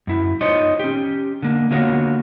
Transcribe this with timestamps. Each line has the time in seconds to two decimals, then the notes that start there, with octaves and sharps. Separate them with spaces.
0.07 F#2 E4
0.41 D#4 F4 C5 C#5 D#5
0.79 C#4 G4
1.42 D3 A#3
1.71 D3 A#3 B3 F4 F#4 C#5